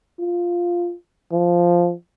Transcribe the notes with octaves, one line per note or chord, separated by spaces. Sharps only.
F4
F3